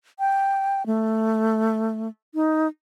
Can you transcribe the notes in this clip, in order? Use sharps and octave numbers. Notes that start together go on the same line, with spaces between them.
G5
A3
D#4